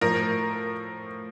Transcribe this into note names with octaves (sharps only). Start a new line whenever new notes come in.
A2 F3 A#4